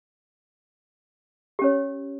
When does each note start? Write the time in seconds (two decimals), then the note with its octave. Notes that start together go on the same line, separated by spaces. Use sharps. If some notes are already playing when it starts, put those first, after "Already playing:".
1.59 G4
1.62 C#4
1.64 C#5